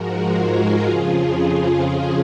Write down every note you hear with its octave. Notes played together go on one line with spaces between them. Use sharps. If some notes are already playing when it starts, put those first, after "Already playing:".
Already playing: G#2 F3 G#3 F#4 A#4
F4 G#4
F2 C#3 F3